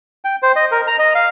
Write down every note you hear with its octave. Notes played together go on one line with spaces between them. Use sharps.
G5
C5
D#5
A#4
A#5
D#5
F5